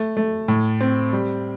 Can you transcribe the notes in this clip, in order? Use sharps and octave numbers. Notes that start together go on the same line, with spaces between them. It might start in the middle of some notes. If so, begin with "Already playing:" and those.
Already playing: A3
A3
A2
C4
G3